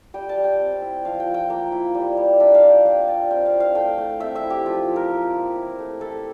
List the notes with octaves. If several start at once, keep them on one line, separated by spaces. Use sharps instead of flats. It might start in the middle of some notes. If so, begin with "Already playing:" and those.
G3 G5
A5
G3
G5
C4
E4
F3 F5
G5
F3
G5
A#3
E4
G3
G3
D4 E5
F5
F4
G5
G3 G5
G3 A5
C4 G5
F5
E4
F5
A3 G5
A3
C4 E5
E5
E4
G4
F3 F4
F3
A#4
A#3
E4
E4
A3
E4 A4